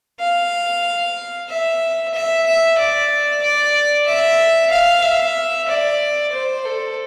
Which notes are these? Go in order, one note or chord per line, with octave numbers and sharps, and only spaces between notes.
F5
E5
E5
E5
D5
D5
E5
F5
E5
D5
C5
A4